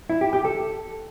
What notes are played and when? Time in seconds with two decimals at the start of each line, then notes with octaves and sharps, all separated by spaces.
0.10 E4
0.21 G4
0.33 G4
0.45 A4